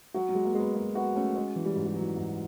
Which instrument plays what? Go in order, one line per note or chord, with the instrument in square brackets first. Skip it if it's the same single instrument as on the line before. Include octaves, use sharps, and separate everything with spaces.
[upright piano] F#3 [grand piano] F#4
[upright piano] F#3
[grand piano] G#3
[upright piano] A#3
[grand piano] G#3 [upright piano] B3
[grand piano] G#3 [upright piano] A#3
[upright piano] B3 [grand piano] F#4
[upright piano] A3 [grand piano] C#4
[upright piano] G#3 [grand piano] C#4
[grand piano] E3
[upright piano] G3
[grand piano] G#2
[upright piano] G3
[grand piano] E3 [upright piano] F#3
[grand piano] G#2